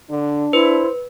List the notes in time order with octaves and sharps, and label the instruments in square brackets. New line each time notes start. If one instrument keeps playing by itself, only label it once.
[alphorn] D3 [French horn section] D4
[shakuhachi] E4 [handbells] B4 [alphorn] C5